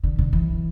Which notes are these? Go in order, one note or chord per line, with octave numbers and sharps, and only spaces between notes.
D3
D3
E3